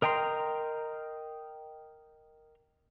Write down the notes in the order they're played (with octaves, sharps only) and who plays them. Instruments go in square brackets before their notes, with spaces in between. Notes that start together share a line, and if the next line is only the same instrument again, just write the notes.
[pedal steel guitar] A#4 D#5 G5 A#5 C6